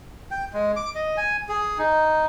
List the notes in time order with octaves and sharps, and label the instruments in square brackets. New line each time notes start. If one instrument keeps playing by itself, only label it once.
[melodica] G5
G#3
D6
D#5
G#5
G#4
D#4